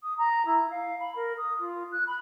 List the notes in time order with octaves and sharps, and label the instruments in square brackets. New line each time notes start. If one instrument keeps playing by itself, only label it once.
[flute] D#6
A#5
E4
F5
B5
A#4
D#6
F4
F#6
B5